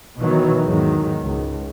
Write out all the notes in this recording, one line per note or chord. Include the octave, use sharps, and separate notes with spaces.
B2 D#3 E3 F#3
E2 G#2 D#3 F#3
C#2